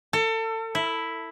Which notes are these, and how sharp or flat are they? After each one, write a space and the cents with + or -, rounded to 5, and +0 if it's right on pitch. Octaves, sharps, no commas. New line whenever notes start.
A4 +30
E4 +0